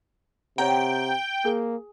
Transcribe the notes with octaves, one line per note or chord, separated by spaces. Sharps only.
C3 C#5 F#5 G5 A#5
A#3 G#4